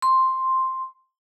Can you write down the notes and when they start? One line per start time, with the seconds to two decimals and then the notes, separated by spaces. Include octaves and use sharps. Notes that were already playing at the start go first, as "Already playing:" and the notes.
0.02 C6